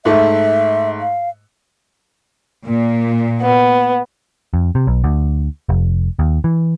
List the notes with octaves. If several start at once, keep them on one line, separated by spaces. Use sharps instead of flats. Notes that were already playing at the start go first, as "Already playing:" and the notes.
G#2 A3 E5
F5
A#2
B3
F2
C3
B1
D2
F1
D#2
E3